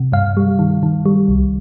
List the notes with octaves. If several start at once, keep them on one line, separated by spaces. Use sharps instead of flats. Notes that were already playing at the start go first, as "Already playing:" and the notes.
Already playing: C3
G2 F5
G3
D#3
D#3
G3
C2